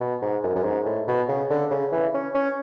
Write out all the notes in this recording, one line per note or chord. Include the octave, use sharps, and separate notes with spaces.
B2
G#2
F#2
F#2
G#2
A2
B2
C#3
D3
C#3
E3
C#4
C#4